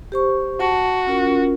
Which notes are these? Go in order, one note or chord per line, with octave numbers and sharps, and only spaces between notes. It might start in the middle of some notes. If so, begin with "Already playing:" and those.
G4 C5 C#6
F#4 A5
C#4 F4 A#4